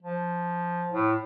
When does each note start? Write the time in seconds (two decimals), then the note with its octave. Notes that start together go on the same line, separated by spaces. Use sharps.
0.03 F3
0.92 A2